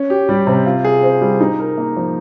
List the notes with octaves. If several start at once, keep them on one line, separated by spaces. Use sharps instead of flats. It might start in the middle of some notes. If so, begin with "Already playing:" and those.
Already playing: C#4
G4
G3
C3
F4
G#4
C4
G3
D#4
A#4
A#3
F3